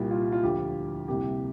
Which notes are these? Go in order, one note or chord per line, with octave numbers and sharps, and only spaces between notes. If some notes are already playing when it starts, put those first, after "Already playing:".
Already playing: C2 A#2 G3
F4
F4
D2 D3 F3 G4
C2 C3 A#3 G4